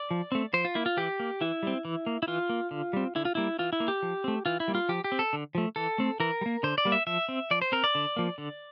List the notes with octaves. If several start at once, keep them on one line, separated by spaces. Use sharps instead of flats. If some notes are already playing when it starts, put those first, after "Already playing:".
Already playing: D5
F3
A3 C4
F3 C5
F4
A#3 E4
F4
E3 G4
A#3
E3 E4
G3 C4
E3
A#3
E4
E3 F4
A#3
D3
G3 C4
D3 E4
F4
G3 A#3 E4
E3 F4
E4
A#3
G4
F3
A3 C4
E3 F4
E4
G3 A#3
F4
F3 G4
G4
C4
A4
D3
F3 A3
E3 A4
A3 C4
E3 A#4
G3
A#3
D3 C5
D5
G3 A#3
E5
F3 E5
C4
F3 D5
C5
C4 A#4
D5
D3
F3 A#3
D3